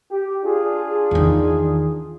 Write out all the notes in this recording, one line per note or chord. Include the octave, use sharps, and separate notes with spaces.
G4
D4 F4 G#4
E2 D#3